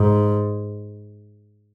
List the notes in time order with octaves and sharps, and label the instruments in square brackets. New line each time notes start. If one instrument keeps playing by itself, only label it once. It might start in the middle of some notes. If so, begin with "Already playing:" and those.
Already playing: [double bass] G#2